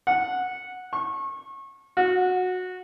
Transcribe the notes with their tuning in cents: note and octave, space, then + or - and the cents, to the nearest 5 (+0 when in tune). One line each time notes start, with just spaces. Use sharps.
F#5 -10
C#6 -30
F#4 -15